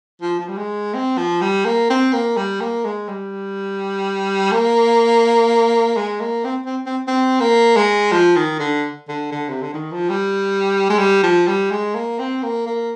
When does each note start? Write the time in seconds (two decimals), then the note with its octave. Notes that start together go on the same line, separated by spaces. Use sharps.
0.22 F3
0.39 F3
0.48 G3
0.57 G#3
0.94 C4
1.18 F3
1.41 G3
1.65 A#3
1.90 C4
2.13 A#3
2.37 G3
2.61 A#3
2.85 G#3
3.08 G3
4.52 A#3
5.96 G#3
6.20 A#3
6.44 C4
6.65 C4
6.86 C4
7.07 C4
7.40 A#3
7.76 G#3
8.12 F3
8.36 D#3
8.59 D3
9.08 D3
9.32 D3
9.49 C3
9.62 D3
9.73 D#3
9.92 F3
10.10 G3
10.89 G#3
10.99 G3
11.23 F3
11.47 G3
11.71 G#3
11.95 A#3
12.19 C4
12.43 A#3
12.66 A#3